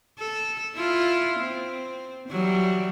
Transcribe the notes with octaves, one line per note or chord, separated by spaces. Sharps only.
A4
E4 F4
C4
E3 F#3 G3